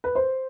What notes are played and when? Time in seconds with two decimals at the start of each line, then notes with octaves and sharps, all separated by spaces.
0.04 B4
0.15 C5